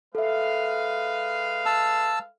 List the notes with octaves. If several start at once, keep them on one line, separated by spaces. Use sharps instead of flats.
G#3 A4 B4 E5 F5
A5 E6